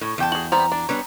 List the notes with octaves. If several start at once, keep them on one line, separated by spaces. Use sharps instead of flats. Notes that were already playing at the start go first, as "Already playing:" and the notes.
A2
E2 G5 A5
F#4 G#4 F#7
G3 B3 C4 A#5
D4
G3 B3 D4 C#5